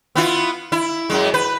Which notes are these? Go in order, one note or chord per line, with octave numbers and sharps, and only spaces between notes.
B3 E4 F4
E4
F#2 G#3
B4